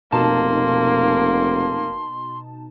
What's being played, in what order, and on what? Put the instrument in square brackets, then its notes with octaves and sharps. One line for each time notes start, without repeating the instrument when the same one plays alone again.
[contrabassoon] F1 [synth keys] B2 D#4 A5 [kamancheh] A#3 [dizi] C6